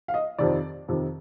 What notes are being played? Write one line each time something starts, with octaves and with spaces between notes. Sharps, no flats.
F5
D#5
F2 C3 D#3 D5
F2 C3 D#3